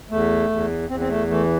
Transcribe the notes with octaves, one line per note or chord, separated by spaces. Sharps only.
E2 A3
E2
E2 C4
C4
A3
E3 A3